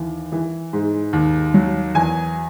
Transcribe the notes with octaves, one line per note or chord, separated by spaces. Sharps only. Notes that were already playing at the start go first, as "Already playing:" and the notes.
Already playing: D#2 E3
E3
G#2
D#2
F#3
E2 G#5